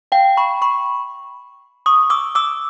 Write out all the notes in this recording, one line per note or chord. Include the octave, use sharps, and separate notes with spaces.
F5 G5
B5 C#6
B5 C#6
C#6 D#6
D6 E6
D6 E6